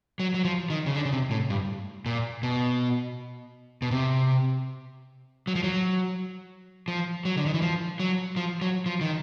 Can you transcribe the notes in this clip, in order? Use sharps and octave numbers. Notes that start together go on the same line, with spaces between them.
F#3
F#3
F3
D#3
C#3
D3
C#3
C3
A2
G2
A#2
B2
B2
C3
F#3
F3
F#3
F3
F#3
D3
D#3
E3
F3
F#3
F3
F#3
F3
D#3